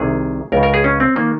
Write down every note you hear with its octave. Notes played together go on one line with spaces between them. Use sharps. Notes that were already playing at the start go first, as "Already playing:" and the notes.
Already playing: C2 C3 D#3 G#4
C#2 C#3 A#4
A#4
G#4
C#4
C4
D#3 A#3